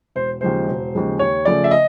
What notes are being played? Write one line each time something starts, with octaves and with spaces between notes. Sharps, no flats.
E1 C5
D#2 C#3 F3 G#3 C5
E1
D#2 C#3 F3 G#3
D#2 C#5
C#3 F3 A3 D5
E5
D#5